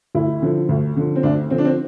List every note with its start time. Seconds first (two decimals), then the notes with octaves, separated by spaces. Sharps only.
0.15 D2 E4
0.42 D3 F3
0.69 D2
0.96 D3 F3
1.16 C4
1.23 D2 D4
1.50 D3 F3 C4
1.58 D4
1.65 C4